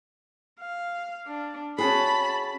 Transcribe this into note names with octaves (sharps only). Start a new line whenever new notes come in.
F5
D4
C#4 F#4 G#4 A5 B5